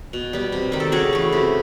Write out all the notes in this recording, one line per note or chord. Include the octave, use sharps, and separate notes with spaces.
B2
G3 B3
C3
D#3 G3
A4
C#3 F#4 G#4
E3 A3
C3